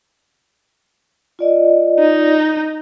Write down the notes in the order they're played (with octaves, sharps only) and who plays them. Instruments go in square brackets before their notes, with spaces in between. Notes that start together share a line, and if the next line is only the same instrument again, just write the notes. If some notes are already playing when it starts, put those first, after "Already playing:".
[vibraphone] F4 D5 D#5
[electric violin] D#4